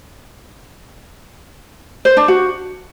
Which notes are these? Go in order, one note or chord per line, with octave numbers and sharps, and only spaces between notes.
C5
D4
F#4